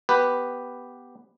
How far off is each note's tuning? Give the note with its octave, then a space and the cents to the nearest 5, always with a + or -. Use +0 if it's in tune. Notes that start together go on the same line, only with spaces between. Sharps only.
B3 +0 G4 +0 B4 +0